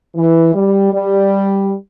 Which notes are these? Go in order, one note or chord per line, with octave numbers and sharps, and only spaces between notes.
E3
G3
G3